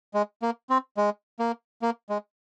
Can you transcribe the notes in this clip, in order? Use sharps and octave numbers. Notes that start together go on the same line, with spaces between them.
G#3
A#3
C4
G#3
A#3
A#3
G#3